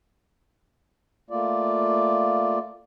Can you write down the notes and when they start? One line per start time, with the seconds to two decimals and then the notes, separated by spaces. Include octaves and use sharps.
1.30 A3 A#3 F4 D5